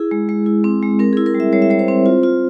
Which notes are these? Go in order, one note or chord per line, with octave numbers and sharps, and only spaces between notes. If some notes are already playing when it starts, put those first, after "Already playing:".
Already playing: E4 G#4
G#3
G#3
E4
C4
G#3
C4 A#4
E4 G#4
A#4
G3
E5
G3 C#5
E5
G3 C#5
C5
C4
F4
F4